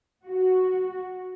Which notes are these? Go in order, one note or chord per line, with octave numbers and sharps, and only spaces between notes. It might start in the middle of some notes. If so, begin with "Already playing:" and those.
F#4